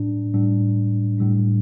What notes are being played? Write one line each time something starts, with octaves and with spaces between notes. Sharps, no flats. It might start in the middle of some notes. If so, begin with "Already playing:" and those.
Already playing: A2 G3 D4
A2 G3 D4
A2 G3 D4